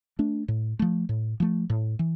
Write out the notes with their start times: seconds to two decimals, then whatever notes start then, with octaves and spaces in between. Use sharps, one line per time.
0.19 A3 D4
0.48 A2
0.79 F3 A3
1.09 A2
1.40 F3 A3
1.70 A2
1.99 E3